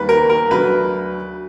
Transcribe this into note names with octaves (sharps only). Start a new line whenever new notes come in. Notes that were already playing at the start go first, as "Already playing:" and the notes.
Already playing: D#2 D#3 G3 A#3 B4
A#4
A#4
D2 D3 F#3 B4